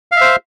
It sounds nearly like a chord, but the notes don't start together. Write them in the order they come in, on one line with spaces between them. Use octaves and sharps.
F5 E5 C5